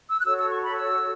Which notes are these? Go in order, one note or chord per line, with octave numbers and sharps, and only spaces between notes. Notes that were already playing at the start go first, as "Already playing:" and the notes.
E6
F#6
F#4 A4 C#5 E6
E6
C#6
B5
E6